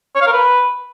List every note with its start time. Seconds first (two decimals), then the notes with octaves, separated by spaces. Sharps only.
0.15 C#5
0.21 F5
0.27 A#4
0.32 B4